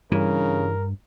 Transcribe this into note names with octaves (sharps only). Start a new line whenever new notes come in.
G2 C#3 E3 A#4